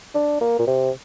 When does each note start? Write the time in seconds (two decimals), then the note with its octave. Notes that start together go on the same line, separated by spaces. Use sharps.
0.15 D4
0.41 A#3
0.59 A#2
0.67 C3